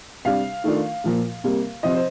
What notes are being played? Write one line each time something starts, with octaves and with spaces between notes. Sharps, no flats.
C3 G3 D4 F5
D#3 A3 D4 F4
A#2 F3 A#3
C3 G3 A#3
C3 F3 C4 F4 D#5
C5